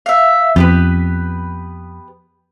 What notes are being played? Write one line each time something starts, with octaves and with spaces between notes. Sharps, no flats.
E5 F5
F2 B3 G4 B4